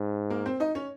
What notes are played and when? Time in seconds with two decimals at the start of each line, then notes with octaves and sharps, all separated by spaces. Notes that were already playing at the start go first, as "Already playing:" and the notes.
Already playing: G#2
0.30 A#3 A#4
0.46 C4 C5
0.60 D#4 D#5
0.75 C#4 C#5